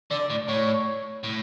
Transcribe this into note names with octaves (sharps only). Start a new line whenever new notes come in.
D3 D5
A2
A2 C#5
A2